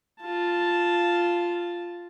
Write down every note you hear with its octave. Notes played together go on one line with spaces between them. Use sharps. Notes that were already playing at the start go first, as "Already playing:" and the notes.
F4 A5